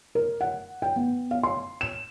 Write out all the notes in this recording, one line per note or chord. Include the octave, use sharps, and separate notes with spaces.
A#4
F#5
G5
B3
F5
C6
E7